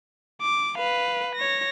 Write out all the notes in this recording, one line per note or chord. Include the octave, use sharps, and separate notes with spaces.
D6
B4 F5
C#5 A#6